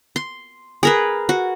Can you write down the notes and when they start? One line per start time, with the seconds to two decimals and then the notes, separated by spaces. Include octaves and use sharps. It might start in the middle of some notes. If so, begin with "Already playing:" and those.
0.16 C6
0.83 G#4 A#4 B4
1.29 F#4